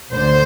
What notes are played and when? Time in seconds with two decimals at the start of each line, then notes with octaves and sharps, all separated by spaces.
0.12 D2 D3 C5